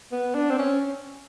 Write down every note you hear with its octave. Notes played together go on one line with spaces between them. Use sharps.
B3
D4
C4
C#4